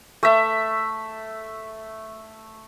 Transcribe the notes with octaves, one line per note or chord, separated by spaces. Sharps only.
A3 E5